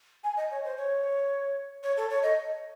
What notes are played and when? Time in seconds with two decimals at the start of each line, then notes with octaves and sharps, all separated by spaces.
0.24 G#5
0.37 D#5
0.51 C#5
0.64 C5
0.77 C#5
1.83 C#5
1.97 A4
2.10 C#5
2.23 D#5